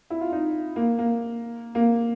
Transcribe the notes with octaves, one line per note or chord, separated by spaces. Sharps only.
E4
F4
D#4
A#3
A#3
A#3